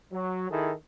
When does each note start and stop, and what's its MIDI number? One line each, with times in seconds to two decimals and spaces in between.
0.12 0.50 54
0.50 0.71 51
0.50 0.71 64
0.50 0.71 68
0.50 0.71 69